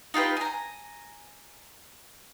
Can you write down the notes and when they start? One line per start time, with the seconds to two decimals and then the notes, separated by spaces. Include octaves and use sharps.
0.14 D#4 F4 G4 B4
0.37 G#5 A#5